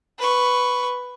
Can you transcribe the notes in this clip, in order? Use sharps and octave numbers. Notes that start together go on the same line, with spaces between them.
B4 C#6